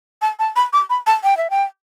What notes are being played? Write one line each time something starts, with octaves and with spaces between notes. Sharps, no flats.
A5
A5
B5
D6
B5
A5
G5
E5
G5